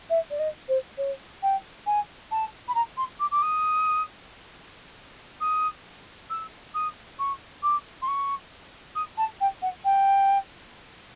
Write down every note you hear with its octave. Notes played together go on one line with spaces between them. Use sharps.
E5
D5
D#5
C5
C#5
G5
G#5
A5
B5
A#5
C6
D6
D6
D#6
D#6
E6
D#6
C#6
D6
C6
C#6
D#6
A5
G5
F#5
G5